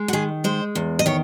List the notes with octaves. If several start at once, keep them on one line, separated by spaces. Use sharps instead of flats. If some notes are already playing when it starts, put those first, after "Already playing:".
Already playing: G#3
F#4
D#3 G#4
G#3 C5
E2
D#5
D#3 C#5